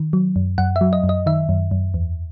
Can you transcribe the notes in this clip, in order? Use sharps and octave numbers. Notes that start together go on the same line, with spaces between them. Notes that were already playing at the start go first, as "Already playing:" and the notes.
Already playing: D#3
F#3
F#2
F#2 F#5
E5
F#3
D#5
F#2
D#5
D#3 E5
F#2
F#2
E2